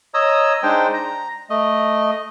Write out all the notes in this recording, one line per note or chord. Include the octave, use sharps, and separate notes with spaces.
C#5 D#5 A#5 D#6 E6
G#3 D4 D#4 C5 G5
A#5
A3 D#5